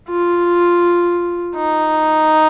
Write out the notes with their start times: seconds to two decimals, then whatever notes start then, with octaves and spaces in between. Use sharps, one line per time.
0.10 F4
1.56 D#4